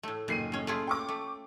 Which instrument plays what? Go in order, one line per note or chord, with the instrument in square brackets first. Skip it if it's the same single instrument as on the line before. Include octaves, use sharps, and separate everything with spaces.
[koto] A2 A3
[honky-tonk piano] F#1 C7 D#7 [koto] A#2 D#3
[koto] A2 C#4
A3 F4 G#4
[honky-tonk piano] G5 C#6 D6
[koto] A3